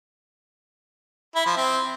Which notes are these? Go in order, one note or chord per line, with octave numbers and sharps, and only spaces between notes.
E4
F3
C4